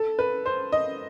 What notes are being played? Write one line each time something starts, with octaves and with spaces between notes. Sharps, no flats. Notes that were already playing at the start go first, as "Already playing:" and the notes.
Already playing: A4
B4
C5
D#5